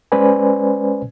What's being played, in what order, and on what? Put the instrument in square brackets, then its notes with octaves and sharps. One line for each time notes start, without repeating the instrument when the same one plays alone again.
[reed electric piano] G#3 C#4 B4 C5 D5 G#5